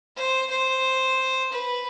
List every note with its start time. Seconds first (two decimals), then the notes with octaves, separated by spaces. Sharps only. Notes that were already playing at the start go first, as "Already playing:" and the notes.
0.17 C5
0.51 C5
1.52 B4